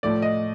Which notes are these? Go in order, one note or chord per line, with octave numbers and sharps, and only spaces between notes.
A2 F3 A3 D5
D#5